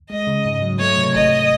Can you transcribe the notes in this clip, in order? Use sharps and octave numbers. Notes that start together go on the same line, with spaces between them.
G#3 D#5
C#3
G#2
F#3
A3 C#5
C3
G#1 D#5